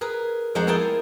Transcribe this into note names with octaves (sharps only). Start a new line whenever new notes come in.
G#4 A#4 B4
F2 G#3 A#4 C5 F#5
B3 E4 G#4 A#4 G5 A5